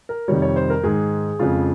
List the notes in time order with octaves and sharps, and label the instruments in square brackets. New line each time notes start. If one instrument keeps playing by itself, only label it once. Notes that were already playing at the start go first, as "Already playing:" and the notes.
[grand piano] A#4
F2 C3 D#3 G3 C#5
C#5
C5
A#4
G#2 D#3 G#3 G#4
F2 C#3 G#3 F4